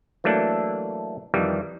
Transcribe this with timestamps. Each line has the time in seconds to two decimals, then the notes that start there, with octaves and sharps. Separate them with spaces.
0.24 E3 F#3 A3 A#3 D4 A4
1.34 F2 D#3 E3 G3